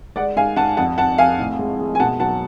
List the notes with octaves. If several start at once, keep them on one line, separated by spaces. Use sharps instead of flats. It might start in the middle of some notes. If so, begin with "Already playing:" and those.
G#3 D5 F#5
G#2 F5 G#5
G#2 F#5 A5
F2 F#5 A5
F2 F#5 A5
F2 F5 G#5
A2
G#3
G#3
G#5
B2 F#5 A5
F#3 F#5 A5